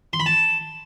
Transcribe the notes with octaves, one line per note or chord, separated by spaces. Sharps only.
C6
B5
A5